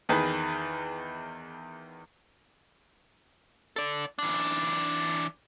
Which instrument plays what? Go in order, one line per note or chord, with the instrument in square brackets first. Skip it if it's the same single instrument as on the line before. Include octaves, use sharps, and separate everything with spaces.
[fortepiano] E2 D#3 G#4 B4 B5
[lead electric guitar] A4 D5
E3 D4